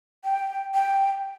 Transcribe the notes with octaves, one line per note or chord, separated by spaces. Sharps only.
G5
G5